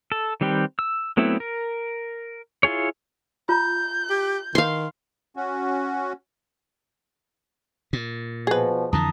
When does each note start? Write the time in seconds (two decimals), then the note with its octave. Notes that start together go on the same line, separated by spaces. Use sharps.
0.12 A4
0.41 D#3 G3 C4 G4 B4
0.79 E6
1.17 F#3 A3 B3 C4 E4
1.40 A#4
2.63 E4 F4 G#4 C#5
3.49 F4 A#5 G6
4.10 G4
4.55 D#3 F5 C6
5.36 C#4 F#4
7.93 A#2
8.47 B2 F3 G#4 B4
8.93 F2 D3 E3 A5 A#5 D#6